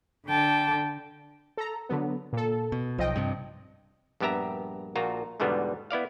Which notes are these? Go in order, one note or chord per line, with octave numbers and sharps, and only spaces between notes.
D3 G5 A5
A4 A#5
D3 F#3 B3
A#2 A4
B2
B1 F3 D#5 G5
G2 C3
A#1 G2 B3 G4 E5 A#5
A#1 A#2 F4 F#4 A#5
E2 G#2 B2 D3 G3 B3
B3 E4 D5 F5